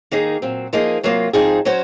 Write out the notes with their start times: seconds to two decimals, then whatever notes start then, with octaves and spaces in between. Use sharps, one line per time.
0.12 D#3 A#3 D#4 G#4
0.42 A#2 F#3 C4
0.73 F3 A#3 D#4 G#4 D#5
1.03 C3 F#3 A#3 F4
1.33 G#2 F3 C4 D#4 G#4
1.65 F#3 C#4 F#4 C5